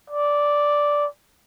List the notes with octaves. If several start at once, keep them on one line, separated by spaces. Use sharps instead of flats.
D5